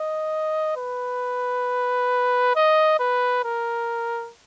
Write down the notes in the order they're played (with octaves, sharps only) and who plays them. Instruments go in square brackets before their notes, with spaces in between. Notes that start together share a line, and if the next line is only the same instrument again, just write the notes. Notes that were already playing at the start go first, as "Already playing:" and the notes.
Already playing: [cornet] D#5
B4
D#5
B4
A#4